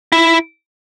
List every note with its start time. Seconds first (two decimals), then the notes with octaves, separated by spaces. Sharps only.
0.12 E4